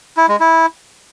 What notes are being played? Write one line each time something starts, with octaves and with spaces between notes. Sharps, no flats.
E4
G#3
E4